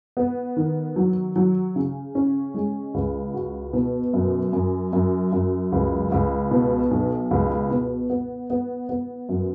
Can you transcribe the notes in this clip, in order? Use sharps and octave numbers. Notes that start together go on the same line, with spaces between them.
B3
D#3
F#3
F#3
C#3
C#4
G#3
C#2
F#4
B2
F#2
F#2
F#2
F#2
C#2
C#2
B2
B1
C#2
B2
B3
B3
B3
F#2